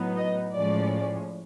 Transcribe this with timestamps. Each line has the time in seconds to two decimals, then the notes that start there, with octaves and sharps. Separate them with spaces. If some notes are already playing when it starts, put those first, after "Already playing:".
Already playing: A2 F#3 B3 D#4
0.16 D#5
0.54 A2 F3 G#3 C#4 D5